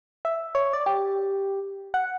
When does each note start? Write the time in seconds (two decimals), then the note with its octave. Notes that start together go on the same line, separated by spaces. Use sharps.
0.25 E5
0.55 C#5
0.73 D5
0.86 G4
1.94 F#5